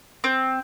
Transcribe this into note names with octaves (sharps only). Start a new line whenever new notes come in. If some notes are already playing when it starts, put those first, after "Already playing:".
C4